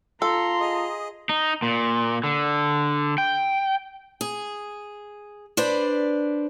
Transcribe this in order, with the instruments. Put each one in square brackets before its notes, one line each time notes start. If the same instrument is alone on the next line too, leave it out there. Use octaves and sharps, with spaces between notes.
[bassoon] F4 [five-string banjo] A4 [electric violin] A#5 C6
[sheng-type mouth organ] G#4 D#5
[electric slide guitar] D#4
A#2
D3
G5
[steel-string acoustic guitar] G#4
D4 B4 C5 D5